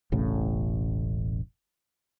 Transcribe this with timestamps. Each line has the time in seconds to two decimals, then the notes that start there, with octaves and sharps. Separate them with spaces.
0.12 E1 A1 A2 C#3